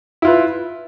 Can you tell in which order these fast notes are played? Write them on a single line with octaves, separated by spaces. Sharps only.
E4 F4 B4